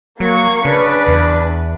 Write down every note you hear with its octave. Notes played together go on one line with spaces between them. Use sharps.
F#3 A#3 C#6
C#3 D4 B4
E2